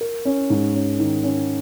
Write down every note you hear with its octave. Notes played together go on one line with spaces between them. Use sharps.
A#4
C#4
G#2
C#4
D#3
C#4